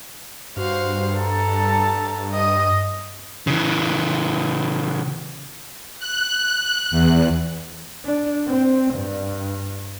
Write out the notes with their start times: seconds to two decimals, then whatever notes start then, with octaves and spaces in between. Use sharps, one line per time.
0.57 G2 F#4 C5 F5
1.19 A4 A5 A#5
2.31 D#5 D#6
3.47 C#3 E3
5.99 F#6
6.91 E2
8.05 D4
8.48 C4
8.95 G2